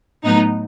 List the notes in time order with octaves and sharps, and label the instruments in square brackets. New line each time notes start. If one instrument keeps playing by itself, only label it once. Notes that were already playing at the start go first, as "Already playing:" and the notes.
[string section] A2 F#3 B3 D#4